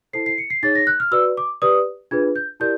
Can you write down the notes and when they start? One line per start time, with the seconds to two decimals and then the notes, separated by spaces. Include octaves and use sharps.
0.13 E4 A4 C5 C7
0.26 C7
0.38 C#7
0.50 C7
0.63 D#4 G#4 C#5 A6
0.75 A#6
0.87 F#6
1.00 F6
1.12 F#4 B4 D5 E6
1.37 D6
1.62 G4 B4 D5 D#6
2.11 D4 F4 G#4 B4 G#6
2.36 G6
2.60 E4 G4 A#4 D5 G6